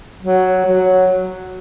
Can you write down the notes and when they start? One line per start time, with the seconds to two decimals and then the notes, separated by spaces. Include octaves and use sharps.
0.23 F#3
0.66 F#3